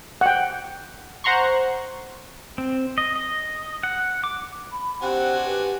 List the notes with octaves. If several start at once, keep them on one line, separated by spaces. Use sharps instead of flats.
F#5 G5
C5 F#5 A#5 C6 C#6
C4
D#5
D#5
F#5
D6
B5
C4 D4 F#4 G4 F#5 G#5
G4 B4